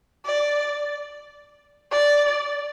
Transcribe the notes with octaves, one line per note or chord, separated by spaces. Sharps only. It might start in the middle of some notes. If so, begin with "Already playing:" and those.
D5
D5